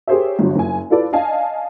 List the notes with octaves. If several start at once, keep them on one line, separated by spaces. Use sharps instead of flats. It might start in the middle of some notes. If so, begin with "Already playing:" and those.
G4 G#4 A#4 C5 C#5 E5
G1 D3 F#3
F#1 G#5
E4 F4 A4 B4 D5
D5 D#5 F5 G#5 A5